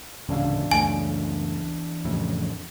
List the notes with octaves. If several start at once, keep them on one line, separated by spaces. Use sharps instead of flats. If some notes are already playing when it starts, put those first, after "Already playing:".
D1 E2 G#2 C#3 D4 F5
C#2 F#2 A3 G#5
F2 A2 C#3